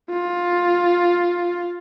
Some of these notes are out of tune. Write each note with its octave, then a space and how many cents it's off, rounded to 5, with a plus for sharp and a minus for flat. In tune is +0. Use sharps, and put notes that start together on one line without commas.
F4 +10